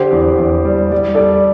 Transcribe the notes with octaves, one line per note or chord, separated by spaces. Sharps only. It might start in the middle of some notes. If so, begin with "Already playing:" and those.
Already playing: D3 G4 C5
E2
E2
G3
G3 D5
G3 A4 D5